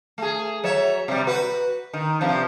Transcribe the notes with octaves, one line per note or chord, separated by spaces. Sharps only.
A3 G#4
F#3 C#5 E5
C3 G3
F#4 B4
D#3
G2 C3 F3